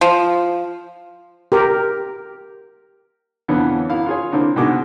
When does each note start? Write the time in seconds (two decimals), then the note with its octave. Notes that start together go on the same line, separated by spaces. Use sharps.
0.01 F3
1.52 G4 A#4
3.48 F2 D3 E3 B3 C#4
3.89 F#2 E4 F5
4.06 F4 G#4 C#5
4.32 D3 A#3 C4 E4
4.56 G#2 B2 D3 G#3 F#4 D6